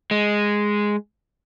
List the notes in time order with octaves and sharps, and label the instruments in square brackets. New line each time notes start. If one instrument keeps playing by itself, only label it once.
[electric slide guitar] G#3